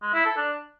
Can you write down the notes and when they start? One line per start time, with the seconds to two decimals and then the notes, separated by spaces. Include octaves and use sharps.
0.02 G#3
0.14 E4
0.25 A4
0.37 D4